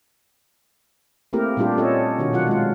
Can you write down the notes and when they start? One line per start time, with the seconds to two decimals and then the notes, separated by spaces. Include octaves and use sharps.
1.33 A3 A#3 C4 E4 G4 A#4
1.57 A#2 G3 D4 F4 G4
1.77 C4 C#4 A4 C#5 D#5
2.19 B2 D#3 D4 F#4
2.33 B2 F#3 F4 F#5
2.47 G#3 F4